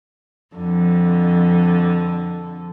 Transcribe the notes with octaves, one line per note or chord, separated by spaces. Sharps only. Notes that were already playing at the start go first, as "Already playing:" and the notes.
F2 D3